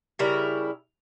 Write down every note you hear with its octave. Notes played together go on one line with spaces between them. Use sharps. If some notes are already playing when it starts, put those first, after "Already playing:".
C#3 G3 E4 A#4